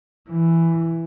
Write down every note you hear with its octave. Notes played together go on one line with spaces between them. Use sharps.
E3